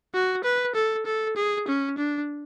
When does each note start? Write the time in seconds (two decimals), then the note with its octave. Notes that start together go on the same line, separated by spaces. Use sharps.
0.14 F#4
0.44 B4
0.75 A4
1.06 A4
1.37 G#4
1.67 C#4
1.98 D4